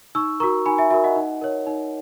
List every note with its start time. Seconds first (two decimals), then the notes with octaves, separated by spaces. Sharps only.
0.15 D#4 C#6 E6
0.40 A#4 A#5 C#6
0.43 F#4
0.65 D#4 G#5 B5
0.78 E5 G#5
0.90 F#4 A#4 E5
1.04 D#5 F#5
1.16 D#4
1.42 A#4 C#5
1.67 D#4